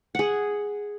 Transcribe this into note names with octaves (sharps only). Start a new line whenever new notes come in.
G#4 F#5